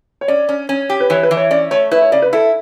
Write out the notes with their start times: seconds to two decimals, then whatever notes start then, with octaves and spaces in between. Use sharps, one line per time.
0.21 C#5
0.28 C#4 D5
0.49 C#4
0.69 C#4
0.90 G4
1.00 B4
1.10 E3 C#5
1.23 B4
1.31 E3
1.37 C#5
1.51 C#4 D5
1.71 A3 C#5
1.91 E4 B4
2.02 C#5
2.12 C#3 D5
2.22 B4
2.33 E4 A4